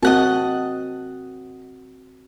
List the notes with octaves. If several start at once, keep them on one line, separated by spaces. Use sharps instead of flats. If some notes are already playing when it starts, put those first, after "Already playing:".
C4 F#4 A#4 D#5 F#5 A5